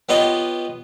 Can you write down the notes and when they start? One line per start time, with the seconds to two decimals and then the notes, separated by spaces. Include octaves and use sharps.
0.09 B3 F4 G4 C#5 D#5